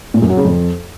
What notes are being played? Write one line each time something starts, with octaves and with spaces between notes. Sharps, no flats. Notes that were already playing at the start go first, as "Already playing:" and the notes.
A#2
F#2
F#3
C#3
F2